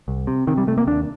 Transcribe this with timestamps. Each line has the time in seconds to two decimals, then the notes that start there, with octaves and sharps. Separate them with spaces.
0.08 C2
0.27 C3
0.47 C3 D#3
0.57 G3
0.67 C3 A3
0.78 A#3
0.87 D#2 D4